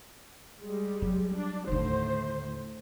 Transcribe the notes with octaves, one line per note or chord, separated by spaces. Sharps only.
G3 G#3
F#3
D4
D#2 A2 D3 C5